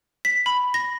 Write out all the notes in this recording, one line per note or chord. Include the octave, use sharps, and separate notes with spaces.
B6
B5
A#6